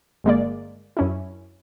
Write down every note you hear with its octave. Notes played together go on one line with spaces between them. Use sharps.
G1 G#3 A#3 D5
F#2 C#4 E4